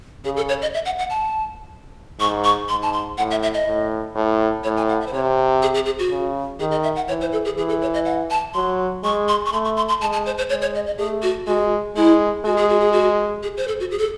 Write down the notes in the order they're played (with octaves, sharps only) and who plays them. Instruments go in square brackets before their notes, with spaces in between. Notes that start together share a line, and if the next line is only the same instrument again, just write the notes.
[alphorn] C#3 [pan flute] G#4
[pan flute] A4
C#5
D#5
E5
F#5
F#5
A5
[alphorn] G#2 [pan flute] C#6
[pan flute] C#6
[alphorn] G#2 [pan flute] C6
[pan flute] A5
C6
[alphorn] A2 [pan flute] F#5
[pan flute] E5
E5
D#5
[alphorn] A2
A2
[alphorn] A2 [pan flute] C#5
[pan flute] G#5
F#5
E5
C5
[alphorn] C3 [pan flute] C#5
[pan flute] G#4
G#4
G#4
F#4
[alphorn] C#3
[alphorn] D#3 [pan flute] G#4
[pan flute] D#5
E5
F#5
[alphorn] E3 [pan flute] C#5
[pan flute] C5
A4
G#4
[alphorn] E3 [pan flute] G#4
[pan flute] A4
C#5
D#5
F#5
A5
[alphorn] F#3 [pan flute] C6
[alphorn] G#3 [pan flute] C#6
[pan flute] C6
C#6
[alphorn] A3 [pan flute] C6
[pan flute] C#6
C6
C6
[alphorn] G#3 [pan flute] A5
[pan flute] A5
C5
C5
[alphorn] G#3 [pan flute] C#5
[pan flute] C#5
D#5
D#5
[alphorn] A3 [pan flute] G#4
[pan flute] F#4
[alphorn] G#3 [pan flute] F#4
[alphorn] G#3 [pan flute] E4
[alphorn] G#3 [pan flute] F#4
[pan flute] G#4
F#4
G#4
F#4
G#4
C5
A4
F#4
G#4
A4